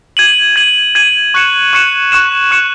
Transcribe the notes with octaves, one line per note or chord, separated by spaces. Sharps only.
G#6 D#7 F#7
G#6 D#7 F#7
G#6 D#7 F#7
C#6 F#6 C#7 E7
C#6 F#6 C#7 E7
C#6 F#6 C#7 E7
C#6 F#6 C#7 E7